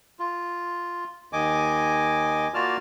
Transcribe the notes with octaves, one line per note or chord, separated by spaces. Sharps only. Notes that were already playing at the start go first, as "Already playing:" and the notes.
F4
D#2 D#3 D#5 G#5 D6
A#3 F4 F#4 D5 A5 F6